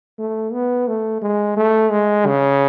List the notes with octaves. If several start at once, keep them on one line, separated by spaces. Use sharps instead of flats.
A3
B3
A3
G#3
A3
G#3
C#3